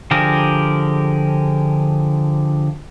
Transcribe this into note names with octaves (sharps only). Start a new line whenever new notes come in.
D3 F3 G4 G#4 A#4